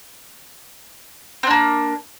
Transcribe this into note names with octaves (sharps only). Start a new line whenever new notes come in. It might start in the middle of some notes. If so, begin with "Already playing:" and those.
A#3 C4 D4